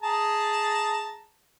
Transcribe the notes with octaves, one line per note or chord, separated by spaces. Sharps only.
G#4 A5 A#5